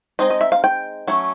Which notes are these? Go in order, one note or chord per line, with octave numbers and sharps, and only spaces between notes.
G#3 C4 D#4 D#5
D#5
E5
F5
G5
F#3 A3 C#4